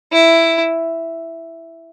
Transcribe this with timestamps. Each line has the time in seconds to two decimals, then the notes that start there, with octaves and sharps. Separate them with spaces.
0.12 E4